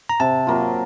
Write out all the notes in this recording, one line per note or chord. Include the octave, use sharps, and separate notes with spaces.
A#5
C3 A5
F#3 A#3 F4